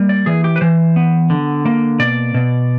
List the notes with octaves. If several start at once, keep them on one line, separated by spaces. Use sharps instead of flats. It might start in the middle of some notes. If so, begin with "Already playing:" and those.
Already playing: G3 A#3
D5
E3 G#4
G4
B4
E3 C5
B3
D3
A#3
B2 D5
B2